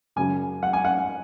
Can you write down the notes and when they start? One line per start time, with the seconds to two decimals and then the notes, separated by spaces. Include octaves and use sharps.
0.16 F#2 C#3 F#3 G#5
0.63 F#5
0.73 G#5
0.85 F#5